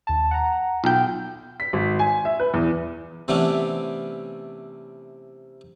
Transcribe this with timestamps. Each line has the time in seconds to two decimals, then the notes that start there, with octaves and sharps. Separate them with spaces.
0.07 D#2 A5
0.31 F#5 A#5
0.84 B1 F4 G5
1.60 B6
1.73 G#1
1.99 G#5
2.25 E5
2.40 B4
2.54 E2
3.28 C3 E3 A3 B3 C#4 D4